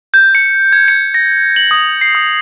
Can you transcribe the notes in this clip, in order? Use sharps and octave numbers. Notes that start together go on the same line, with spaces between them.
G6
C#7
G#6
C#7
A#6
F#7
D#6
C7
D#6